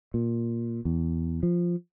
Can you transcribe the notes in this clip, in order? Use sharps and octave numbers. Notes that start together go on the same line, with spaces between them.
A#2
E2
F3